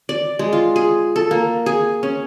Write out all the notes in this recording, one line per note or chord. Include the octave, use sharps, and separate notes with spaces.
D5
G#3
F4
G#4
A4
A#3
G#4
C#4